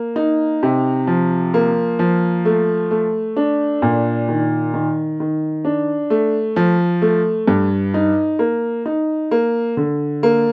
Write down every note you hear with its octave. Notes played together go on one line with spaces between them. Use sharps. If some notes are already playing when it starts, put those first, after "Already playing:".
Already playing: A#3
D#4
C3
F3
A#3
F3
A3
A3
D4
A#2
D#3
D#3
D#3
D4
A3
F3
A3
G2
D#4
A#3
D#4
A#3
D3
A#3